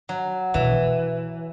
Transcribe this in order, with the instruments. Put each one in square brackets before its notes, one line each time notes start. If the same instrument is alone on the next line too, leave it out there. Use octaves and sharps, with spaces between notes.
[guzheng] F#3
[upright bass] B2 [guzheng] E3